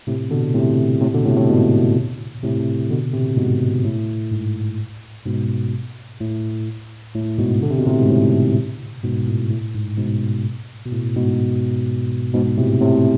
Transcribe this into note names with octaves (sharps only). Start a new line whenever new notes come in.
A2 C3
B2 D3
A2 C3
A2 C3
B2 D3
A2 C3
A2
G#2 B2
A2 C3
B2 D3
A2 C3
G#2 B2
A2
G#2
G#2 B2
A2
A2
G#2 B2
D3
C3
B2
A2 C3
G#2
A2
G#2 B2
A2
A2
G#2
G#2 B2
B2
A2
G#2 B2
G#2 B2
A2 C3
A2 C3